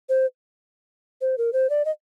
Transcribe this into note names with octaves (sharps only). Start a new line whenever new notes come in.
C5
C5
A#4
C5
D5
D#5